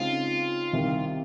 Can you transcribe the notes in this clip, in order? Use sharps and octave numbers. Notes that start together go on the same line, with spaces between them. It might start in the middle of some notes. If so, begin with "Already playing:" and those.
Already playing: C#3 G#3 C4 D#4 F4
C2 C3 D#3